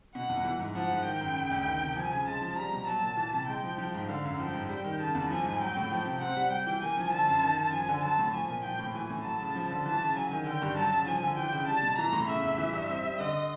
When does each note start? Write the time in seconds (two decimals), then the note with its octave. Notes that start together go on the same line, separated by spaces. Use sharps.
0.15 B2 F#5
0.29 E2
0.45 E3
0.59 G#2
0.75 F3 F#5
0.91 G#2
1.05 D#3 G5
1.21 F#2
1.36 C#3
1.51 D2
1.66 D#3
1.81 C3
1.96 F3 G#5
2.12 C#3
2.27 G#3 A5
2.41 F3
2.57 G3 A#5
2.72 B2
2.87 F#3 A5
3.02 A#2
3.17 E3
3.33 C3
3.48 G#3 G5
3.64 F3
3.78 F3
3.94 G#2
4.09 D3 F5
4.25 F#2
4.39 F3 G5
4.54 G#2
4.69 G3 G5
4.84 D#3
5.00 C#3 A5
5.15 E2
5.30 F3 G#5
5.46 G#2
5.61 F#3 G5
5.76 A2
5.91 F3
6.06 C3
6.21 C4 F#5
6.36 G3
6.51 G3 G5
6.67 E3
6.82 A#3 G#5
6.97 F3
7.13 D3 A5
7.28 F#2
7.42 D#3
7.58 F#2
7.73 F3 G#5
7.89 D3
8.03 F#3 A5
8.19 A2
8.33 F3 G#5
8.50 A#2
8.64 F3 G5
8.79 A2
8.94 E3 G#5
9.10 A2
9.24 F#3 A5
9.40 C#3
9.55 F3
9.70 D3
9.85 E3 A5
10.01 C#3
10.15 F#3 G#5
10.31 D#3
10.46 D3 G5
10.62 G2
10.76 F#3 A5
10.92 C#3
11.06 F3 G#5
11.22 D3
11.37 E3 G5
11.52 C#3
11.67 G3 A5
11.82 B2
11.98 E3 A#5
12.13 A2
12.28 C#3 E5
12.43 E2
12.58 E3
12.73 G2
12.89 C4
13.04 G3
13.19 D3 D#5